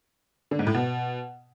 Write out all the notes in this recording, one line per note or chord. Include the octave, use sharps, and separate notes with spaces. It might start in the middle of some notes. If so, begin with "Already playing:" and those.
D3
G#2
A2
B2